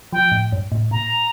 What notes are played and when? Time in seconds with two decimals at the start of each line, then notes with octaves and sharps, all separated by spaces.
0.13 F3 G5
0.32 A2
0.52 G2
0.72 A2
0.91 A#2 A#5